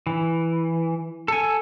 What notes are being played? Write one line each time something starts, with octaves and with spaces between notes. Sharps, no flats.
E3
A4 G#5